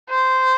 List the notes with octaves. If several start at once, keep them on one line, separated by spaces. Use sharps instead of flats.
C5